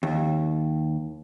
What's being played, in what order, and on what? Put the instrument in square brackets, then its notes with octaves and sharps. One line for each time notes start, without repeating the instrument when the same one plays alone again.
[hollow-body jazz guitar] D#2